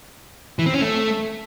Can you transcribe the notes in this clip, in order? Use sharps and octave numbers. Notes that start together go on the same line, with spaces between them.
E3
C4
C#4
A3